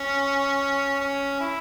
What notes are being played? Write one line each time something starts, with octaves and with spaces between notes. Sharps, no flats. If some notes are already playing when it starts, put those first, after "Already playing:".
Already playing: C#4
C#4
E4